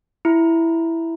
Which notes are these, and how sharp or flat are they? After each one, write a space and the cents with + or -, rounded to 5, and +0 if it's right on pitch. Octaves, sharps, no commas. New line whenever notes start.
E4 +0 A#5 +0